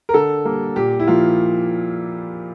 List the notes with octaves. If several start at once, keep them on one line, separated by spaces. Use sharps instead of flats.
A#4
D3 A4
G3 A#3
A#2 G4
E4
F3 A#3 F4